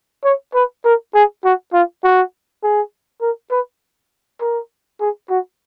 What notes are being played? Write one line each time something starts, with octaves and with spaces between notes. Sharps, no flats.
C#5
B4
A#4
G#4
F#4
F4
F#4
G#4
A#4
B4
A#4
G#4
F#4